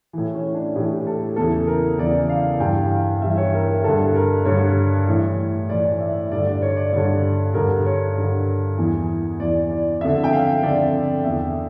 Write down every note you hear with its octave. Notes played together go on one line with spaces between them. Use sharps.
A2 E3
C#4
D4
A2 E3 G4
A4
E2 C#3 E3 A4
A#4
E2 C#3 E3 D5
F5
G2 E3 G5
F5
G2 E3 E5
C#5
A#4
A#4
G2 D3 A4
A#4
G2 D3 C#5
A2 E3
A2 E3 D5
E5
G2 D3 D5
D5
C#5
D5
G2 D3 C#5
G2 D3 A#4
C#5
G2 D3
E2 E3
E2 E3 D5
D5
F2 D3 E5
G5
F5
F2 D3 D5
E2 D3 E5